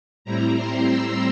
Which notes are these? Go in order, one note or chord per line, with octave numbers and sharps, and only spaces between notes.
A2 G3 C4 E4 A#5
C6
E6